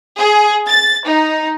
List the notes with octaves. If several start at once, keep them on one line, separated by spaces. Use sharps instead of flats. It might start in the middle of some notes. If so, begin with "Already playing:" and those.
G#4
A6
D#4